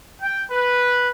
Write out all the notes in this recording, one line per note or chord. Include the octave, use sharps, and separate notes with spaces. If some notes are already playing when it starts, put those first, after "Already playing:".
G5
B4